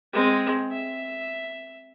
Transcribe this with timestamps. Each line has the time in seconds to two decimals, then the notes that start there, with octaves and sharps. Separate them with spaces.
0.13 G#3 C4
0.72 E5